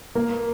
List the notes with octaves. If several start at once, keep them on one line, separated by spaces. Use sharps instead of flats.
A#3